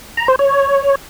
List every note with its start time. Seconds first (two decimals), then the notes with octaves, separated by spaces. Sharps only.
0.17 A#5
0.28 C5
0.39 C#5